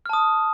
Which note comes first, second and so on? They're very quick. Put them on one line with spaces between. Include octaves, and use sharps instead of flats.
F6 A5 D#6